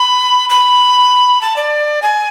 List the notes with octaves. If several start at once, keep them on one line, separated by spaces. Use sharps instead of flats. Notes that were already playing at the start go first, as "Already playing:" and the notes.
Already playing: B5
B5
A5
D5
G#5